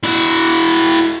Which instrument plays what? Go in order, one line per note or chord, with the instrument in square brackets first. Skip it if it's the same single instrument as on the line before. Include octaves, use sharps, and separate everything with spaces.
[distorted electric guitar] E4 F#4